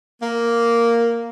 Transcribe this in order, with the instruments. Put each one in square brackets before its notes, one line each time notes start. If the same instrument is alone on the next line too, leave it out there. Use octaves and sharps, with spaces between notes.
[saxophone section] A#3